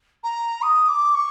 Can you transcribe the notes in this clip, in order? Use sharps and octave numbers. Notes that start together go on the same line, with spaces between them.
A#5
D#6
D6
C#6